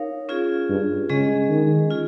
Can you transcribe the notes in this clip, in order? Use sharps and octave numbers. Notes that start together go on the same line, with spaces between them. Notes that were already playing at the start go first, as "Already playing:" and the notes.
Already playing: D#4 A#4 C#5 F5
C#4 F4 G#4
G2
C#3 G#3 C#4 G#4 D#5
D#3
F4 G#4